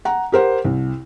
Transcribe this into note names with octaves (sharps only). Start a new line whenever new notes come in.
F#5 A#5
G4 A#4 C5 F#5
C2